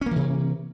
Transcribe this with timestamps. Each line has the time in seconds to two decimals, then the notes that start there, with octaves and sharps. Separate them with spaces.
0.01 C#4
0.06 A#3
0.11 E3
0.16 C3